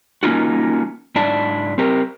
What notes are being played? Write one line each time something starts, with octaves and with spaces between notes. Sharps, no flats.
A#3 C#4 D#4 F4 F#4
G#2 D4 E4 D5 A5
C4 G4 A#4